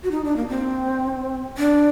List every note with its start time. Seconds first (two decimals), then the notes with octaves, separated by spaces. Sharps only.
0.03 F#4
0.11 D#4
0.24 D4
0.37 A#3
0.48 C4
1.58 D4